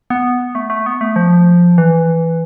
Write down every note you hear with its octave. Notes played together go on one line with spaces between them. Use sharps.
B3
A3
A3
B3
A3
F3
E3